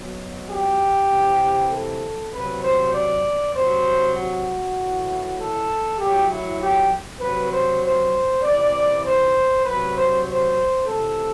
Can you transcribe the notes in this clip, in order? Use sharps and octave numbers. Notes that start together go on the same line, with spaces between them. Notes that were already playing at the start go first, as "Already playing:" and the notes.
Already playing: B2 F#3
G4
C3 E3
A4
C3 F#3 B4
C5
D5
C3 F#3 C5
F#4
A2 E3
A4
A2 F#3 G4
E4
G4
C3 F#3 B4
C5
C5
C3 E3 D5
C5
C3 F#3 B4
C5
C5
C3 E3 A4